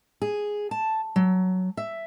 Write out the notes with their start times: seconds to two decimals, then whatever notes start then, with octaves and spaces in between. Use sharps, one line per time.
0.22 G#4
0.71 A5
1.16 F#3
1.77 E5